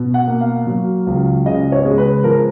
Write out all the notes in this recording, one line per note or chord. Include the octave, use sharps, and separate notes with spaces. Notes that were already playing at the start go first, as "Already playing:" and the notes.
Already playing: B2
F#5
A#3
F5
F#3
C#2
C#3 D#5
C#5
G#3
B4
F3 A#4